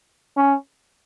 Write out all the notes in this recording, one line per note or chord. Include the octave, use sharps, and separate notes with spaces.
C#4